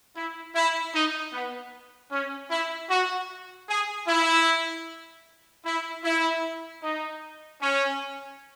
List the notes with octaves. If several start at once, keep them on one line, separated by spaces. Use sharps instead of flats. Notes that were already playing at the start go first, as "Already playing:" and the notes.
E4
E4
D#4
B3
C#4
E4
F#4
G#4
E4
E4
E4
D#4
C#4